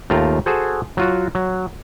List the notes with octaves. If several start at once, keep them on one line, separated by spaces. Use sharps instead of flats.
D#2 A3 F4 G5 A#5
F#4 G#4 A4 C5
F#3 F4 F#4
F#3